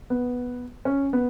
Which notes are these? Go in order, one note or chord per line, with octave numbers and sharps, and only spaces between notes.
B3
C#4
B3